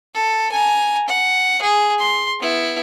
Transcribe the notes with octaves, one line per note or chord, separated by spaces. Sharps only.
A4
G#5 A#5
F#5
G#4
C6
B3 E4